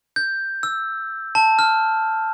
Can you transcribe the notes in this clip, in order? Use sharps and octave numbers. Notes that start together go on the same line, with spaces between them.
G6
E6
A5
F6